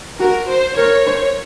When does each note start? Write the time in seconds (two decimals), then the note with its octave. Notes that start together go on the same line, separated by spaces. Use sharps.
0.20 F#4 A#4
0.49 C5
0.77 A#4 C#5
1.06 C5